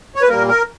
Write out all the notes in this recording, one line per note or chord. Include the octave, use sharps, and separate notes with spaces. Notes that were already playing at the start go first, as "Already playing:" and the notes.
C#5
B4
A#2 G3 A#3 A#4
A#4